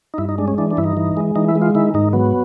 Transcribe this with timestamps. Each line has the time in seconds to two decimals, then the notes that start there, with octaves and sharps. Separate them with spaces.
0.14 D#4
0.18 G2 E4
0.29 D#4
0.38 G#3 D4
0.48 C#4
0.58 E3 D4
0.71 D4
0.77 G2 E4
0.84 D#4
0.97 E3
1.17 G#3
1.36 E3 D#4
1.48 E4
1.56 G#3
1.62 F4
1.75 D#3 E4
1.94 G#2 D#4
2.13 F#3 B3